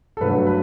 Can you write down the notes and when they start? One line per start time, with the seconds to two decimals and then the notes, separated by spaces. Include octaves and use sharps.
0.17 A4
0.21 G2 F#3 A3 B4
0.47 B4